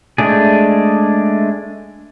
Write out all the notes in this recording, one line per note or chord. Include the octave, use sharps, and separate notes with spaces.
G#3 A3 D4 G#4